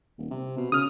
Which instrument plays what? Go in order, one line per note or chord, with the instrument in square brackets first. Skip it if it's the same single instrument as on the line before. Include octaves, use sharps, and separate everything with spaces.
[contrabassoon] D#1
C3
B2
[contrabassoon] C#3 [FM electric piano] D#6 F6